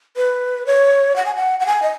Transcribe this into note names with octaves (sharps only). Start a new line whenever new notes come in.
B4
C#5
F#5
G#5
F#5
F#5
G#5
D#5